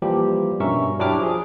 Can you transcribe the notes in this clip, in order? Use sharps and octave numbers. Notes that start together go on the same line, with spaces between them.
E3 F3 G3 A#3 G4
G2 B2 C#4 A#4 E5 C#6
F#3 D4 E4 G4 D6 F6
F3 G#4